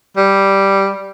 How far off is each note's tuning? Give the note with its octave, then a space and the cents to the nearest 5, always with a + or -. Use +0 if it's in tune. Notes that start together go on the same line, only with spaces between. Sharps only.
G3 +0